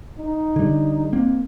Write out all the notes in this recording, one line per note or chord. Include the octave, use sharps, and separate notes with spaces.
D#4
D3 G3
A#3 C4